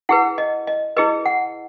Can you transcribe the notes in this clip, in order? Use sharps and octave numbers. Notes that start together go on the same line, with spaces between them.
E4 G#4 B4 F#5
D#5
D#5
E4 G#4 B4 D#5
F#5